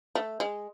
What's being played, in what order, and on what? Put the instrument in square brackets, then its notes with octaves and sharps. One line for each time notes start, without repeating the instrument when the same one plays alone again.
[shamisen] A3
G#3